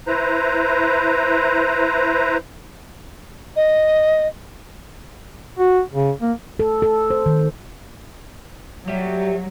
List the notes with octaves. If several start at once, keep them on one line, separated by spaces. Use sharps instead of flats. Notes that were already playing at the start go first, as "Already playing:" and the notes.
E4 B4 C5 A#5
D#5
F#4
C#3
A#3
A4
A4
C5
D#3
F#3 G3 A3 G4